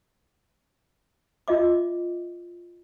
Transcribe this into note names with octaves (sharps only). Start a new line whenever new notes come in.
F4 D#5 E5 D6